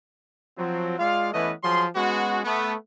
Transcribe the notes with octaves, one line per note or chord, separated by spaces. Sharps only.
F3 F#3 C4
G#3 F4 D5 F5
E3 A3 B3 C#4 B4 D#5
F3 F#3 G#4 C6
G#3 B3 C#4 F#4
A3 B3